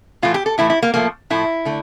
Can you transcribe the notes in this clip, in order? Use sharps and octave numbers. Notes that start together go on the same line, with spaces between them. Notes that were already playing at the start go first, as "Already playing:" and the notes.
A2 E3 A3 F4
G4
A4
A2 E3 A3 E4
E4
A#3
A2 F3 A3 A#3
A2 F3 A3 E4
D3 A3